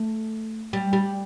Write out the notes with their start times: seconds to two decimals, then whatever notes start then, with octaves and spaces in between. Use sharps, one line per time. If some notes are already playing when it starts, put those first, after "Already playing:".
Already playing: A3
0.73 G3
0.93 G3